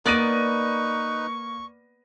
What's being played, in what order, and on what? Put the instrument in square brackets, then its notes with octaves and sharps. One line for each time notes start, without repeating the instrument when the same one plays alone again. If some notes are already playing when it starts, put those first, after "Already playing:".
[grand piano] A#3 A#6 D#7 [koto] B3 D5 [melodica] D#4 B4 [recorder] C#6